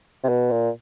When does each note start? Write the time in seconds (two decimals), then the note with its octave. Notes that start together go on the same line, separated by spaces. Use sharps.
0.24 C3
0.29 B2
0.51 A#2